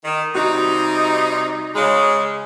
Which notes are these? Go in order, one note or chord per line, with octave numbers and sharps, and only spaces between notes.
D#3
C3 G3 D#4 F#4
C#3 G#3